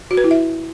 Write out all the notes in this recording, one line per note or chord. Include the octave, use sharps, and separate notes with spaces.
F#4
B4
E4
E5